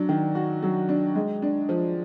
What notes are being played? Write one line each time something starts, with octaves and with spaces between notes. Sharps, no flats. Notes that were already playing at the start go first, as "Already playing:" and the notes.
Already playing: F#3 D4
D#3
F#4
F#3
D4
G#3
D4
F3